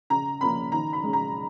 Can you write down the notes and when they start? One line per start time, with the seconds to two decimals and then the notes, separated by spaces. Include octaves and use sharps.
0.10 C#3 A#5
0.41 F3 A#3 C#4 B5
0.72 D#3 A#5
0.93 B5
1.03 G#3 C#4
1.13 A#5